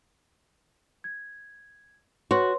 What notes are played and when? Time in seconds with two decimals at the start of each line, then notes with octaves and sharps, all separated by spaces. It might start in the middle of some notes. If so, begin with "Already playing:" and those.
1.04 G#6
2.31 F#4 B4 C#5 C6